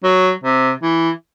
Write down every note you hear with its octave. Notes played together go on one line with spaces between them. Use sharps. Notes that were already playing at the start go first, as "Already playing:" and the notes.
F#3
C3
E3